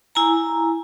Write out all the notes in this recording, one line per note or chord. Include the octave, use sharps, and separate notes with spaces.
E4 G#5 A#5